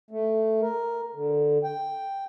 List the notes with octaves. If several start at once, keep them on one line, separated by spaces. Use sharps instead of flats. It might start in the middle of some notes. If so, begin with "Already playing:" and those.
A3
A#4
D3
G5